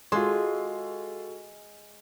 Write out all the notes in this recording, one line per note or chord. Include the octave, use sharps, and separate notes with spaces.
G#3 F4 F#4 A4 C6